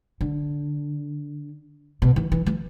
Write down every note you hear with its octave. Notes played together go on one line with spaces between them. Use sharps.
D3
B2
E3
E3
E3